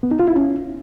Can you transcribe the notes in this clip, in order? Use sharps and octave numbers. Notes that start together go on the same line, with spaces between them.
B3
D#4
F4
E4
C#4